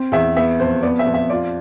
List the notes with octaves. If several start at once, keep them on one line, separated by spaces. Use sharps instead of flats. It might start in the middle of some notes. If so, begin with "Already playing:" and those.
Already playing: C4
E2 E5
B3 E5
F2 C5
B3 D5
E5
F2
E5
F4 D5